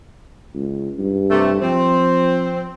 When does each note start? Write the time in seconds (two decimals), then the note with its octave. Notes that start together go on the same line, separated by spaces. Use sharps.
0.54 C#2
0.98 G2
1.29 C3 A3
1.62 F3 C4